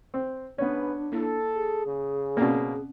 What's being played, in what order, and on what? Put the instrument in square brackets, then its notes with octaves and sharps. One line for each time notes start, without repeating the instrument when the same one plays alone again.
[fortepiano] C4
[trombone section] G#2 B4 [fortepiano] B3 C#4 [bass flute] D4
[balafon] A#3 E4 [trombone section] A4
[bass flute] G#4
[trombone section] C#3
[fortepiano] B2 A#3 [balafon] C4 C#4 D5